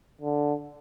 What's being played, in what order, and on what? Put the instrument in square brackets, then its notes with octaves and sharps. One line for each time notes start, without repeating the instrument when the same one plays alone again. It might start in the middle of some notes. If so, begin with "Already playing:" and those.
[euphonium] D3